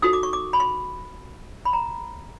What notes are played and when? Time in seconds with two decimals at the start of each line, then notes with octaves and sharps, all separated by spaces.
0.02 D#4 F#4 A4 D#6
0.13 D6
0.23 C#6
0.33 D6
0.53 B5
0.60 C6
1.65 B5
1.73 A#5